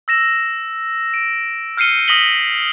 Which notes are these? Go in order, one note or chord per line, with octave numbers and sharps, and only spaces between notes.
E6 A#6 E7
D7
F6 G6 C7 C#7 D#7 G7
D#6 F6 A#6 B6 F#7 G7